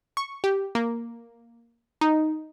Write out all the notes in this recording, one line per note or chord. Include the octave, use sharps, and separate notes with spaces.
C#6
G4
A#3
D#4